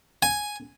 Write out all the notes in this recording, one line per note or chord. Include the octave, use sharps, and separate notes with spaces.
G#5